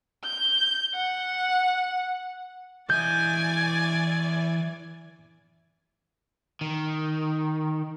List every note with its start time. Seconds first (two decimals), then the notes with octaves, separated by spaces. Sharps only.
0.24 G6
0.94 F#5
2.90 E3 D5 D#5 G#5 G6
6.61 D#3